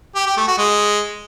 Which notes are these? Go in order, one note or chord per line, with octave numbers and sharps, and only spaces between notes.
G4
G4
A3
F#4
G#3